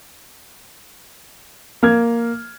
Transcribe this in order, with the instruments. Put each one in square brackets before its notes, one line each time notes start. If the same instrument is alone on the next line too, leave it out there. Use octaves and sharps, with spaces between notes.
[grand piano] A#3 F6 G#6